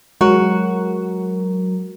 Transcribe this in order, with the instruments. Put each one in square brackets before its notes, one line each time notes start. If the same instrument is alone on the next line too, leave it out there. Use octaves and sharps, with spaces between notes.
[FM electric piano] F#3 A#4 [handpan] G#3 [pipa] F#4